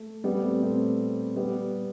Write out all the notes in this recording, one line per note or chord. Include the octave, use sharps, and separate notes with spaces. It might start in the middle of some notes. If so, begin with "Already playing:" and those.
Already playing: A3
G3 B3
A3 C4
A3 C4
G3 B3